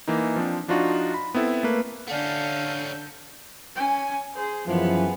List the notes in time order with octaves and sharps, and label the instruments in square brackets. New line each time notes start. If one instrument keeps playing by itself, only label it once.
[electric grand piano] E3 A#3 D#4
F3 C4 D4
F3 D4 D#4 F4 F#4
B5
B3 C4 E4 A4
A3 A#3 B4
[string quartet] D3 A4 G6 [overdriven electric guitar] A3 C#4 [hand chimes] D5 F#5 [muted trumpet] F5
[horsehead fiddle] C#4 G#5
G#4 C5
[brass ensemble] F#2 E3 F3 [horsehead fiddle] B3 G#4